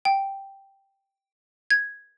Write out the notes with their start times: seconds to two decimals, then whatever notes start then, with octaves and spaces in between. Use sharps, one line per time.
0.05 G5
1.71 G#6